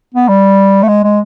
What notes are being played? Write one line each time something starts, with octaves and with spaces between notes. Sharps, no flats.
B3
G3
A3
G#3
G#3